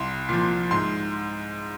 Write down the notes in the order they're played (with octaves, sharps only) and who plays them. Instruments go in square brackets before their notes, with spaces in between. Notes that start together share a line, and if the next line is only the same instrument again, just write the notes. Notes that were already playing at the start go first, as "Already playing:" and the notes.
Already playing: [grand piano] C2 C6
A#2 F3
G#2 C6